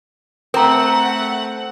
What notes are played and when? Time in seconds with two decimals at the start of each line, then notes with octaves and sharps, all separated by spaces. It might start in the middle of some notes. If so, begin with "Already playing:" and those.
0.54 A3 C4 A#4 F#5 A#5